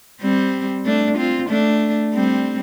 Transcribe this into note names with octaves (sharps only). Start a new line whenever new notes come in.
G3 C4
A3 D4
C4 F4
A3 D4
G3 C4